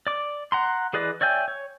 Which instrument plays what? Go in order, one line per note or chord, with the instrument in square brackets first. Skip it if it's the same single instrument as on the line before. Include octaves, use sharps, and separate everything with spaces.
[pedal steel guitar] D5 D6
F#5 A#5 C6
E3 G#4 B4 D5 D#5
C#5 D5 E5 G5 G#5
C#5